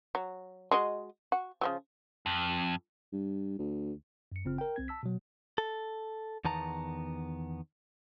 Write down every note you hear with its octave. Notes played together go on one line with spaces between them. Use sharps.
F#3
G#3 F#4 D#5
F#4
C#3 F3 F#3
F2
G2
D2
F#2 C#7
G1 C#3 C4 F4 F6
A#4 G5
C2 C4 G#6
A5 E6 B6
B2 F#3
A4
E2 D#3 B3 A5 A#5